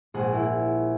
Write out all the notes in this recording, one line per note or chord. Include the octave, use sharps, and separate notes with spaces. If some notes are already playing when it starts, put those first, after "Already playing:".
A#1 G#2 G#4 F#5 G#5
A#3 E4 A#4